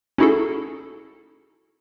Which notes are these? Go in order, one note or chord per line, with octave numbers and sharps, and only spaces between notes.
C#4 D#4 E4 F#4 G#4 A4